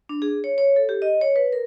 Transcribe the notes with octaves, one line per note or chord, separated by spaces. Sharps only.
D4
G#4
C#5
C#5
A4
G4
D#5
C#5
B4
A#4